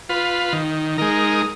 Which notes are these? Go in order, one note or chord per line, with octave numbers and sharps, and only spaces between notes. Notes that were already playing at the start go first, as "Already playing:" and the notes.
F4 B4
D#3
G#3 D#4 A#4